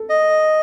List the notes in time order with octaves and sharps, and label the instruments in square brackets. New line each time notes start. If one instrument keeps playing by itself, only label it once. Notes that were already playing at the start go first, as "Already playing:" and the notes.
Already playing: [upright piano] A4
[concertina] D#5